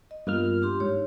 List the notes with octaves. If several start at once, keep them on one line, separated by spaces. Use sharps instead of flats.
D#5
G2 A#3 B3 F4 A#4 F6
D4 G4 C6
G#2 C#5